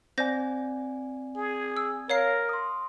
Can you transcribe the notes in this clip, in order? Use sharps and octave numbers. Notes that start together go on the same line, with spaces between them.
C4 C5 D5 G#5 G6 A#6
G#4
E6
A#4 C#5 F5 C7
C6 D#6